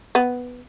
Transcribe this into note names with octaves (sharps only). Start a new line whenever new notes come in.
B3